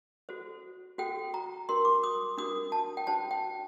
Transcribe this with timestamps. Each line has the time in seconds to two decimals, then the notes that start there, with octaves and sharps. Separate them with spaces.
0.29 F#4 A4 C5
0.98 F#4 A4 C5 G5
1.34 A#5
1.68 D4 F#4 A#4 C6
1.85 D6
2.03 D#6
2.38 D4 F#4 A#4 D#6
2.72 A5
2.97 G5
3.07 D4 F#4 C5 A5
3.31 G5